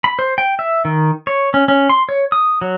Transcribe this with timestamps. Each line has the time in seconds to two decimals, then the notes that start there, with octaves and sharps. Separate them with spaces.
0.04 B5
0.19 C5
0.38 G5
0.59 E5
0.85 D#3
1.27 C#5
1.54 C#4
1.68 C#4
1.89 C6
2.09 C#5
2.32 D#6
2.61 F#3